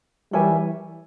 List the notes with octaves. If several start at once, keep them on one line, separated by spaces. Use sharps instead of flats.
E3 G3 A#4 C#5 E5 G#5